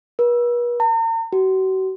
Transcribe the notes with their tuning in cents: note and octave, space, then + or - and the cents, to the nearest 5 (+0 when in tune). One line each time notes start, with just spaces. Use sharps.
B4 -45
A#5 -45
F#4 +40